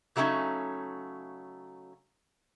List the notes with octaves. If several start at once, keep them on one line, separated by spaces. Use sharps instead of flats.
C#3 F#3 A3 C4 C#4 D#4